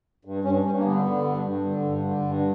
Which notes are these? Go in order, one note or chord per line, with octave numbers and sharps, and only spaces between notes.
G2
G2 C#4
G2 C#4
A#3
D3 B3
D3
G2
G2
D3
G2
D3
G2